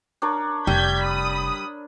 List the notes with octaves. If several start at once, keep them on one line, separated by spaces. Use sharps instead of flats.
D4 A#4 C#5
F1 G3 G6 G#6 B6
B5 D#6